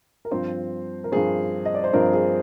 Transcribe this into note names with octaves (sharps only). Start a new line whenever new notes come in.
A#4
G2 F3 C4 C5
A#4
G2 F3 C4 G#4
D#5
D5
C5
G2 F3 C4 A#4
G#4